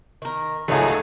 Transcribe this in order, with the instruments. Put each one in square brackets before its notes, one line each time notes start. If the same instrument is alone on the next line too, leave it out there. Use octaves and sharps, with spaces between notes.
[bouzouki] D#3 A#4
[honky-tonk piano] G#1 C#2 [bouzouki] F#3 D#4 F#4 [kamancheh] A3 G#4